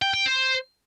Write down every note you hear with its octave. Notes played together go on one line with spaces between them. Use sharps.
G5
G5
C5